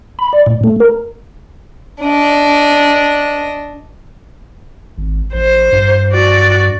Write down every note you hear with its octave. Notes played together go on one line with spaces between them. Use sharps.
B5
D5
A2
A3
A#4
D4 D#5
G#1
A1 C5
G2
F#4 D5